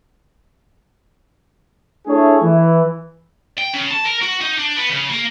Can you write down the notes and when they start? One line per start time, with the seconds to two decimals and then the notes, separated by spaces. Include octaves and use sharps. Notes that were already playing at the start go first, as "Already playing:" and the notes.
2.07 A3 D4 E4 G#4 A4 C#5
2.42 E3
3.58 G5
3.74 C#3
3.91 A5
4.05 A#4
4.22 F#4
4.41 D#4
4.58 D4
4.77 B3
4.89 C#3
5.10 A#3